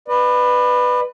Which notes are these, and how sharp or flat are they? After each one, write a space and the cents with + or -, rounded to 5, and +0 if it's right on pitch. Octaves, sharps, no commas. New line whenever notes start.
B4 +5 D5 +40